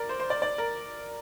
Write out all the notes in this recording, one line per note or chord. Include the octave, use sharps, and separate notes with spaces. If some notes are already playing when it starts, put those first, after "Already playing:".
Already playing: A#4 D5
C5
C5
D5
D5
A#4